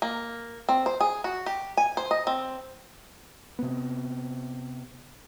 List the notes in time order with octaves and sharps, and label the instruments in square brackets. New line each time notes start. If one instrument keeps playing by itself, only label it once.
[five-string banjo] A#3
C4
C5
G#4
F#4
G4
G#5
C5
D#5
C4
[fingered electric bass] C3 B3